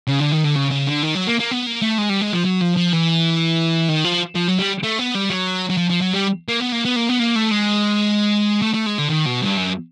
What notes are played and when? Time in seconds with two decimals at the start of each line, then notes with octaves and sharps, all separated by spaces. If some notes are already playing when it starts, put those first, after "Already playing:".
0.08 C#3
0.20 D3
0.32 D#3
0.45 D3
0.56 C#3
0.71 C#3
0.87 D3
1.03 D#3
1.15 F#3
1.27 A#3
1.40 A#3
1.51 B3
1.66 A#3
1.82 A3
1.98 G#3
2.10 G3
2.21 G#3
2.33 F3
2.45 F#3
2.62 F3
2.77 F3
2.93 E3
3.89 D#3
4.04 F3
4.35 F3
4.47 F#3
4.59 G3
4.83 A3
4.99 B3
5.15 G3
5.30 F#3
5.70 F#3
5.77 F3
5.90 F3
6.01 F#3
6.13 G3
6.49 A#3
6.60 B3
6.72 A#3
6.85 B3
6.96 A#3
7.09 B3
7.20 A#3
7.36 A3
7.51 G#3
8.62 A3
8.74 A3
8.87 G#3
8.99 D3
9.09 D#3
9.26 B2
9.42 G2
9.58 F#2